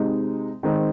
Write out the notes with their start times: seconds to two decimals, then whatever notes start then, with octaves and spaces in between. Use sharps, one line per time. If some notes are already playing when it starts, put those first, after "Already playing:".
Already playing: C3 G#3 D#4
0.63 D#3 G#3 C4 D#4